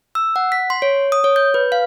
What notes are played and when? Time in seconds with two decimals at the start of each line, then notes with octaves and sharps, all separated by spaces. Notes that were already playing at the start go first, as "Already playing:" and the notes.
0.15 E6
0.36 F#5
0.52 B6
0.70 C6
0.82 C#5
1.12 D#6
1.24 C#5
1.36 G6
1.54 B4
1.72 F5